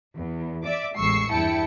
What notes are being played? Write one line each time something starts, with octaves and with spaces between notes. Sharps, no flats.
E2
D5 E5 D6
A1 E2 G#3 C#6 E6 C7
E2 G2 E4 G5 A5 C#7